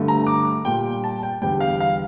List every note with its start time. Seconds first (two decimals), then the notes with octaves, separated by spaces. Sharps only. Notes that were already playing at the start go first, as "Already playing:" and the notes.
Already playing: G2 D3 A3
0.08 A#5
0.27 D6
0.65 A#2 G3 G5
1.04 A5
1.23 G5
1.42 E2 D3 G3 G5
1.60 F5
1.80 F5